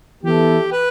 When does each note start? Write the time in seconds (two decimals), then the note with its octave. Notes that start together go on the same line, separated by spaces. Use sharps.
0.23 E3 B3 E4 G4 A4
0.72 B4